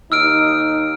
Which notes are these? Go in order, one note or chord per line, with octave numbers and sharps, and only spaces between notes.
D#2 D#4 E6 F6 D7